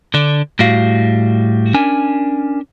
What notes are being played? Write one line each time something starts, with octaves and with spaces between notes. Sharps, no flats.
D3 D4
A2 G3 F#4 F5
C#4 D4 A#4 G#5